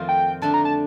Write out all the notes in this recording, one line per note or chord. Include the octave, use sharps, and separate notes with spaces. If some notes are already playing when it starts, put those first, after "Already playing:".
Already playing: F2 D#3 A3 C4 F4
G5
D3 A3 D4 A5
A#5
A5